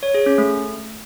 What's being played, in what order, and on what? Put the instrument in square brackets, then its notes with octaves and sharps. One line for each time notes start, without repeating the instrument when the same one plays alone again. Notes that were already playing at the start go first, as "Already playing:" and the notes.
[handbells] C#5
G#4
C#4
A3